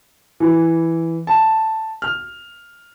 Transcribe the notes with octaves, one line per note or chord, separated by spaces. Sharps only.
E3
A5
F6